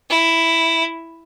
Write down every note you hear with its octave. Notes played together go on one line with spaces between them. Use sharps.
E4